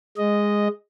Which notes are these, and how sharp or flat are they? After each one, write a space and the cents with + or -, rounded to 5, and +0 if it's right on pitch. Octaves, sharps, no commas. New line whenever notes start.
G#3 -10 D#5 +0